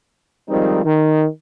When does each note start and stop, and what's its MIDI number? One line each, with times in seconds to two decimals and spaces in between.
0.49 0.81 51
0.49 0.81 53
0.49 0.81 55
0.49 0.81 56
0.49 0.81 60
0.49 0.81 63
0.84 1.25 51